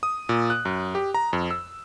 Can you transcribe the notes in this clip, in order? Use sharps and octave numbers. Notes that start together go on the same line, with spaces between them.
D#6
A#2
F#6
F#2
G4
A#5
F2
E6